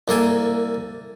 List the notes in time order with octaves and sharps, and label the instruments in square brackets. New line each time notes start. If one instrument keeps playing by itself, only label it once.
[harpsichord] C2 A#3 A4 G#5